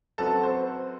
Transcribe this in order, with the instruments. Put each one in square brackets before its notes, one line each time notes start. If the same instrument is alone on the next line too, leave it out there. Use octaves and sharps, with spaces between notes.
[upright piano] F#2 F#3 C4 F#4 B4 [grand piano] A4
[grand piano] C5